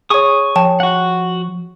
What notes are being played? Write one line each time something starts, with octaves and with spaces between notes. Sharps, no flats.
G#4 C#5 G#5 C#6 D#6
F3 C#5 G5 A5
F#4 F#5